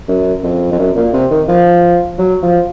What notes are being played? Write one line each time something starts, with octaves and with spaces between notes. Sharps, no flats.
F#2
F2
F2
F#2
A#2
C3
D#3
F3
F#3
F3